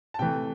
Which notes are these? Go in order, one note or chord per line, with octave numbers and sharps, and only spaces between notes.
A5
C3 E3 A3 G5